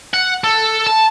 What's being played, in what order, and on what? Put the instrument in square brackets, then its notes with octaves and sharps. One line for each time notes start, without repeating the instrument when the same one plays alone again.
[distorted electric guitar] F#5
A4
A5